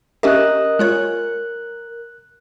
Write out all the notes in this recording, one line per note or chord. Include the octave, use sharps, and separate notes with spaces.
C#4 G4 A#4 D#5 E5 D#6 F#6
G#3 F4 C#5 F#6